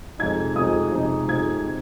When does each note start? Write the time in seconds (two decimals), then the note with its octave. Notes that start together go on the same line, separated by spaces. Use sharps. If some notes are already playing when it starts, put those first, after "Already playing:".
0.19 F2 C3 F3 G#3 D#4 G#6
0.56 F2 C3 F3 G#3 D#4 D#6
0.92 F2 C3 F3 G#3 D#4
1.28 F2 C3 F3 G#3 D#4 G#6
1.66 C4